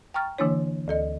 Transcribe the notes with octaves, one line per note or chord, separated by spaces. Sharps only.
G5 A#5 C#6 F6 A6
D3 E3 A#3 D4 E4 C#5
D2 A4 D#5